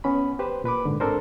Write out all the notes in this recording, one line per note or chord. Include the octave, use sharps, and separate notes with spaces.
B3 C#4 B5
G4 B4 C5
A#2 B4 B5 D6
G#2 D3
C4 D4 A4 A#4 C5